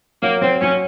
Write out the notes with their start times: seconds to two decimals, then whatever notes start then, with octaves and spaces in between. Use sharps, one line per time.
0.22 F#3 A#3
0.42 F#3 C4
0.61 F#3 C#4